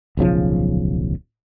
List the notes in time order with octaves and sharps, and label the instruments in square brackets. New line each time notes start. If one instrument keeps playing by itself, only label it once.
[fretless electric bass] D1 B1 C#3 F3